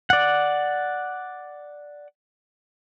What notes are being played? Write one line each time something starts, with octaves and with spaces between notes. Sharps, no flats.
D5 F#5